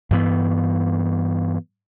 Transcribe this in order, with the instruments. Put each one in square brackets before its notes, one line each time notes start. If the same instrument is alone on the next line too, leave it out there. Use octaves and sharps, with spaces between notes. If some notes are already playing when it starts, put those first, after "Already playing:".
[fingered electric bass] G2 E3 B3